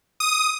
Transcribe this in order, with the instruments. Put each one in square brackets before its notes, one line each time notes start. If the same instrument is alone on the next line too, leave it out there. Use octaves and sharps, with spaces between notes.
[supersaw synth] D#6